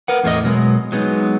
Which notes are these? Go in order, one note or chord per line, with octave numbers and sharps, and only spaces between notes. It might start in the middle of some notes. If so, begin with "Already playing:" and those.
A#4 B4 F#5
E2 A2 A3 A#3 A#4 D#5
B2 F#3 G#3 B3
F#3 G#3 B3 D#4